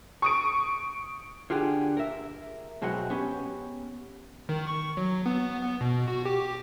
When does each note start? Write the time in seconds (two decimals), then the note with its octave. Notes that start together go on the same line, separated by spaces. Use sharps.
0.22 C#6 D#6 D7
1.50 D3 F4 G4 G#4 F#5
1.97 A#4 E5
2.82 B1 B2 F#3 G#3 C4 F#5
3.10 B3 C#4 G4
4.49 D#3
4.67 C#6
4.97 F#3
5.26 B3
5.63 B3
5.81 B2
6.08 F#4
6.26 G4